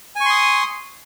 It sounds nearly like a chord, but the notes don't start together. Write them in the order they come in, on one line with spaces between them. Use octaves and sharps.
G#5 C#6 C6 D#6